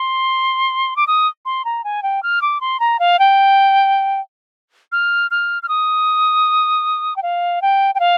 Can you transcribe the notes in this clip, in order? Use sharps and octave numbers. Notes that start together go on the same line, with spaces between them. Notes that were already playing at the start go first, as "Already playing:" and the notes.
Already playing: C6
D6
D#6
C6
A#5
G#5
G5
F6
D6
C6
A#5
F5
G5
F6
F6
F6
D#6
G5
F5
G5
G5
F5